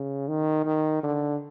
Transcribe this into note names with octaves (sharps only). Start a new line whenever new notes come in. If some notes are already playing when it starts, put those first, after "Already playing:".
Already playing: C#3
D#3
D#3
D3